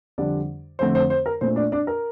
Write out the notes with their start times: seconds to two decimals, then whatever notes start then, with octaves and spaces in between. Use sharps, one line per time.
0.18 F2 D3 G3 D4 D5
0.79 F2 D3 A3 C4 C5
0.95 C5
1.10 C5
1.26 A#4
1.41 A#2 A3 D4 C5
1.56 D4 D5
1.72 D4 D5
1.87 A#4